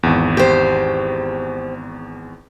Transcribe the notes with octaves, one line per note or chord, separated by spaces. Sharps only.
G#1 E2
G4 C5